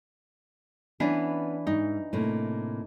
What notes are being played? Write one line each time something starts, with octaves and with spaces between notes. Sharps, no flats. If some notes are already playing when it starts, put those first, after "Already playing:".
E3 B3 C#4 D4
G#2 D#4
A2 C3 A#3